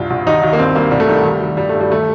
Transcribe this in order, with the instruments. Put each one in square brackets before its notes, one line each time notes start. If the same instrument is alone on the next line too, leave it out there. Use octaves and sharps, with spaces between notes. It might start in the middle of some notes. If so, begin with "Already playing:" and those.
Already playing: [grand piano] C2 G2 F4
C2
D#2 D#4
D#2
A#3
G2 C4
G2 A#3
C2 G3
A3
D#3 G3
D#2
D#2
G2 G3
A3
G2
G3
D#2 A3